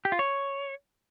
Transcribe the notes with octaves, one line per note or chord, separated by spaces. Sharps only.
G4
F4
C#5